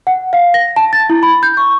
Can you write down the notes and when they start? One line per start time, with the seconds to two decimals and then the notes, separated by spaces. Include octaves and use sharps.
0.07 F#5
0.33 F5
0.54 A#6
0.76 A5
0.93 A6
1.10 E4
1.23 B5
1.43 G6
1.57 C#6